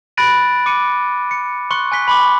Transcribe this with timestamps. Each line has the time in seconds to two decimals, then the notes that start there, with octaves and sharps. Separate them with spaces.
0.17 B5 F#6 A6 A#6 D7 D#7
0.66 D6 C#7 D#7
1.31 C#7
1.71 C6 C#6 F#6 C#7
1.92 G#5 F#6 B6 G7
2.08 B5 C6 D6